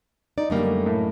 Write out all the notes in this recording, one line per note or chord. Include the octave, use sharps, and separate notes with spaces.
D#4 D5
F#2 D3 G3 A3 A#3 D#4
A2